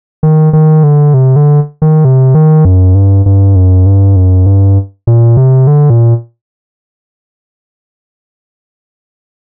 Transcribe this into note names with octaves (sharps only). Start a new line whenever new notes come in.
D#3
D#3
D3
C3
D3
D#3
C3
D#3
F#2
G2
G2
F#2
G2
F#2
G2
A#2
C3
D3
A#2